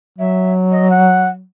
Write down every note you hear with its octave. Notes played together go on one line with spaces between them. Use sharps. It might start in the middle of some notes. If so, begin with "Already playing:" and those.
F#3 E5
D#5
F#5